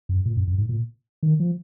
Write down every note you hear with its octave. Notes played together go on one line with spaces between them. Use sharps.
F#2
A#2
F#2
F#2
G#2
A#2
D#3
F3